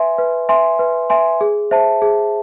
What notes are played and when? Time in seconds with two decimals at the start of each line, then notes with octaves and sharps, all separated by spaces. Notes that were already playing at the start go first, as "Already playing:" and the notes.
Already playing: B4 E5 G#5 C6
0.18 B4
0.49 E5 G#5 C6
0.79 B4
1.10 E5 G#5 C6
1.41 G#4
1.71 C5 E5 A5
2.02 G#4